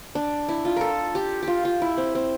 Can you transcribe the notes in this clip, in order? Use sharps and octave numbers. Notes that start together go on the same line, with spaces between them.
D4
E4
F4
A4 A#4
G4
G4
F4
F4
E4
C4
C4